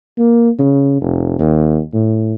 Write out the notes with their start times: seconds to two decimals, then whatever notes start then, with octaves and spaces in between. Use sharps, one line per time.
0.18 A#3
0.59 C#3
1.01 F1
1.39 D#2
1.94 A2